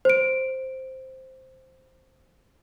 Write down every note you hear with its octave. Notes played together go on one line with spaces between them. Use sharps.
C5 D7